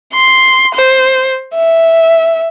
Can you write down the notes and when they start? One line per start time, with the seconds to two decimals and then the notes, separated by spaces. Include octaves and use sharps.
0.13 C6
0.75 C5
1.55 E5